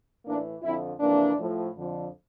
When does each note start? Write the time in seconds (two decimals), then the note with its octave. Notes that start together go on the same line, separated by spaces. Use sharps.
0.25 A2 E3 A#3 D4
0.62 F2 D3 F3 C4 E4
1.00 F2 C3 E3 A#3 D4
1.37 A2 F3
1.76 F2 D3 F3